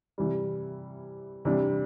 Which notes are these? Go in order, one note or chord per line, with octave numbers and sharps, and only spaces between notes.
C3 E3 G3
C3 E3 G3 D4